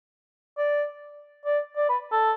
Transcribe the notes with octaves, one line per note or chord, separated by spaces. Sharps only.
D5
D5
D5
B4
A4